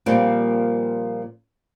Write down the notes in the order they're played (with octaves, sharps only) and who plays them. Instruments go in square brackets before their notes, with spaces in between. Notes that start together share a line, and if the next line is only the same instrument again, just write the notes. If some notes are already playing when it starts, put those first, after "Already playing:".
[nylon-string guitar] A#2 F3 G3 A#3 C4